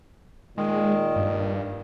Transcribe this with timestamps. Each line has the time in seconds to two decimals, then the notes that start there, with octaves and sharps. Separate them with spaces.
0.58 A#2 D#3 G#3
1.16 G2